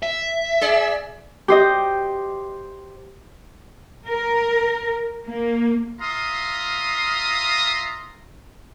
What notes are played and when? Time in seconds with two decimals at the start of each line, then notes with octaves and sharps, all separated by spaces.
0.03 E5
0.61 G#4 D5
1.48 G4 C5 D#5
4.08 A#4
5.26 A#3
6.01 F4 E5 F5 A#5 C6 D#6